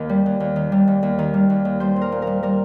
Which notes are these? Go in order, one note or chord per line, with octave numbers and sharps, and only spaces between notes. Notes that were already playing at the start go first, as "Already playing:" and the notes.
Already playing: D#2 D#3 A#4
G3
D#2
D#2
D#3
G3
D#2
D#2
D#3
G3
D#2
D#2
G3 C5
A#2
A#4
A#2
G3 A#4
G3 A#4